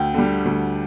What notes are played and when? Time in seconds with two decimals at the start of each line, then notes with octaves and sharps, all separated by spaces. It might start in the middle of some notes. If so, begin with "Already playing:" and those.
Already playing: D2 G5
0.14 D3 G3
0.45 D2